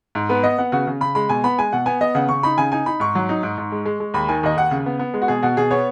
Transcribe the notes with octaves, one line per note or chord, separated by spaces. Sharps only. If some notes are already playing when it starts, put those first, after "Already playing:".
G#2
B3 B4
B3 D#5
B3 F#5
C#3 F#4
C#3
C#3 B5
G#3 B5
B2 G#5
B3 B5
G#3 G#5
B2 F#5
B3 G#5
B3 D#5
C#3 F#5
C#3 C#6
D#4 B5
C#3 G#5
D#4 G#5
D#4 B5
G#2 C#6
F#3
D#4
G#2
G#2
G#3
G#3
G#3
D#2 B5
D#3 G#5
D#2 D#5
D#2 F#5
C#3
B3
B3
G#3
F#4
B2 G#4
B2 F#4
B2 G#4
B3 C#5